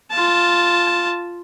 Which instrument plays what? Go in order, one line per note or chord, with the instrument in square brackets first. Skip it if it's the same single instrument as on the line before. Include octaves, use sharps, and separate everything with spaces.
[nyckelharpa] F4 A5